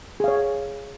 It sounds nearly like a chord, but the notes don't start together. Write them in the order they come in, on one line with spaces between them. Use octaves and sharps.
G#4 F5 C#5